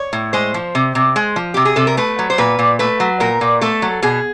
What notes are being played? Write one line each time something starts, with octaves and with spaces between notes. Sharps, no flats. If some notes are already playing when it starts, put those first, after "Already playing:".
Already playing: C#5
A2
G#3 C5
F3
C3
C3
G#3
F3
C3 G4
G#4
C3 A4
A#4
A3 B4
F#3
C5
A#2 B4
A#2
A3 B4
F#3
A#2 A#4
A#2
A3 A4
F#3
B2 G#4